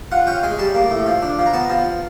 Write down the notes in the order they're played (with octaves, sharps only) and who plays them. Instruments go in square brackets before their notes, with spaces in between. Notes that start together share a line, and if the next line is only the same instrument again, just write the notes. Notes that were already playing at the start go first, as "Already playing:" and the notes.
[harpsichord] F4 F#5
C#4 G5
G#3 G#5
G3 A5
A#3
A2
F3
D4
F3
A#5
B3 A5
F3